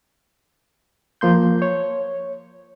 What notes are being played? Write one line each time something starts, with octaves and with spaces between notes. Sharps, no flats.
F3 A#3 C6 G6
C#5